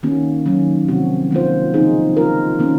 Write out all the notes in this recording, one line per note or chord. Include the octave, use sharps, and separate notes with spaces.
D#3 A#3 C#4 F#4
D#3 F#3 C#4
C3 F3 C4 F#4
D#3 A#3 F4 C5
C#3 F3 C4 D#4 G#4
A#3 F4 A#4
D#3 A#3 C#4